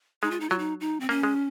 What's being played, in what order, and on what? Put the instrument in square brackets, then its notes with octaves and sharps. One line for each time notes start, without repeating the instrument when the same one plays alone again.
[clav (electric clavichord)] G#3 [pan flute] D#4
[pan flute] F4
D#4
[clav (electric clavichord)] F#3 [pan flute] F4
[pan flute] D#4
D#4
C4
[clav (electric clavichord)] A#3 [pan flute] C#4
[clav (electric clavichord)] G#3